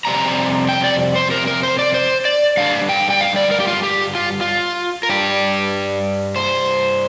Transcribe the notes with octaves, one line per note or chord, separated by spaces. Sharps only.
F2 C3 G3 D4 A#5
G5
D5
C5
A#4
A#4
C5
D5
C5
D5
G2 D3 G3 D4 F5
G5
G5
F5
D5
A#4
G4
F4
G4
F4
F4
A#4
G2 G3 D4 G4
C5